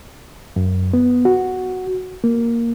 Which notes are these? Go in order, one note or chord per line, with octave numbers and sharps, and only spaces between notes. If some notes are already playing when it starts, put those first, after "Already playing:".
F#2
B3
F#4
A#3